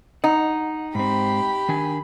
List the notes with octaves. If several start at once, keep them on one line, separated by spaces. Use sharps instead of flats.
D#4 F#5
G#2 C4 G4 B5
D#3 D4 G#5